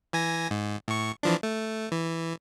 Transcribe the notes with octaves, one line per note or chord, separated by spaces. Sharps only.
E3 G#5 A#6
G#2
A2 C#6
E3 F3 D4
A3
E3